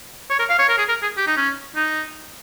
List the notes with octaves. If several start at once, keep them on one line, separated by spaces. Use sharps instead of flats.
C#5
A#4
F5
C#5
A#4
G#4
A#4
G#4
G4
D#4
C#4
D#4